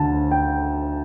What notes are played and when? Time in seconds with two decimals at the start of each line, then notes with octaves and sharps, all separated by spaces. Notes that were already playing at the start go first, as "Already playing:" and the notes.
Already playing: D2 D3 A5
0.31 G5